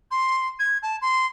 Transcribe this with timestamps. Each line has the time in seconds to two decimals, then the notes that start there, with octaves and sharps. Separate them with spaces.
0.11 C6
0.59 G#6
0.82 A5
1.01 C6